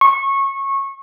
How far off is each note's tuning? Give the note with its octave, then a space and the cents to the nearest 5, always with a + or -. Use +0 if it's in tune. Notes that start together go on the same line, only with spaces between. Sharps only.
C#6 -20